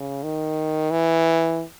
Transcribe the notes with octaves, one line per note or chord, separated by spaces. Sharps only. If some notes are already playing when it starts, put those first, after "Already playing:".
Already playing: C#3
D#3
E3